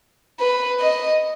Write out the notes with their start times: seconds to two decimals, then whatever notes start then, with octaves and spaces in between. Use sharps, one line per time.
0.40 B4
0.80 D#5